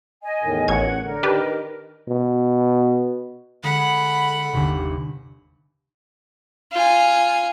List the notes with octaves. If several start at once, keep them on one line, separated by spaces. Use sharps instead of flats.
D#5 G#5
E2 A2 D#3
A1 C#5 F#5 G#6
D3 A#4
D#3 D4 G4 B4
B2
D3 G#3 G#4 F#5 B5 E7
G1 D#2 C3
F4 G#5